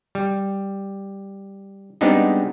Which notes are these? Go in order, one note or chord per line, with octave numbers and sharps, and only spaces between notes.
G3
G3 G#3 B3 C4 D4 D#4